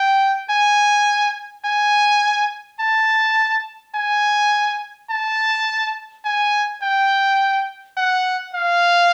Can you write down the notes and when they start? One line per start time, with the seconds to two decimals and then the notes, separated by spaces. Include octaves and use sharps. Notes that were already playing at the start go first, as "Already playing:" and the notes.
Already playing: G5
0.50 G#5
1.65 G#5
2.80 A5
3.95 G#5
5.10 A5
6.24 G#5
6.82 G5
7.97 F#5
8.55 F5